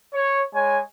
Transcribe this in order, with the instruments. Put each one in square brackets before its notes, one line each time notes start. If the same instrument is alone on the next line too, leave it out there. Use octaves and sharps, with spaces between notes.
[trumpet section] C#5
G#3 C#5 G#5